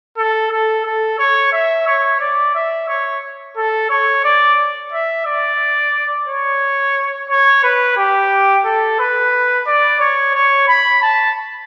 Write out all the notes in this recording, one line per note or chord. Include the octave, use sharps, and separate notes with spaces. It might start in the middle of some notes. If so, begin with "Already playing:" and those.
A4
A4
A4
C#5
E5
C#5
D5
E5
C#5
A4
C#5
D5
E5
D5
C#5
C#5
B4
G4
A4
B4
D5
C#5
C#5
B5
A5